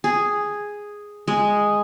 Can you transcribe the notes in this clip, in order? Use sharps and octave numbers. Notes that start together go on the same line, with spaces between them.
G#4
G#3